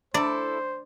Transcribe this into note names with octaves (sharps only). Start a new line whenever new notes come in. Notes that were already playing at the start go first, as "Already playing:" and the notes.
D4 E4 A4 C5 D5